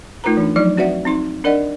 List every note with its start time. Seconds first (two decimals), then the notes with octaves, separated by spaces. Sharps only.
0.24 A3 D#4 F4 A#4 B4 A#5
0.37 E3 D4
0.56 F3 F#3 D#4 D5
0.77 C4 F#4 B4 D5 E5 F#5
1.05 C4 D#4 C6
1.44 D4 A#4 D5 D#5 F#5